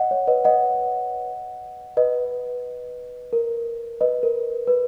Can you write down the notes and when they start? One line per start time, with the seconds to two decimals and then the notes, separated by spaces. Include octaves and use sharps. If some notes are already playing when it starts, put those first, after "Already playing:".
Already playing: D#5 F#5
0.11 C#5
0.27 B4 D#5
0.44 D#5 F#5
1.97 B4 D#5
3.33 A#4
4.01 B4 D#5
4.23 A#4
4.68 B4